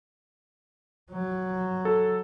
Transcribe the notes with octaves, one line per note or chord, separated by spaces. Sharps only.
F#3
A4